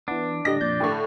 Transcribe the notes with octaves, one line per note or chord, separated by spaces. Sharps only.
E3 B3 D4
A2 D3 G3 D#5 A#6
F2 A#2 D5 G6
A2 D3 G5 C#6